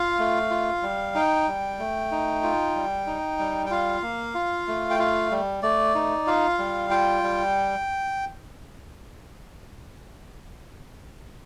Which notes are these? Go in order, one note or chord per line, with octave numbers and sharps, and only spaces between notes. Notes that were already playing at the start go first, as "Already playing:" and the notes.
Already playing: F4 F5
A3
F4
G3
D#4 G5
G3
A3
D#4
F4
G3
D#4
G3
G5
F4 F5
A#3
F4
A3
G5
F4 F5
G3
A3 D5
D#4
F4 F5
G3
F4 G5
G3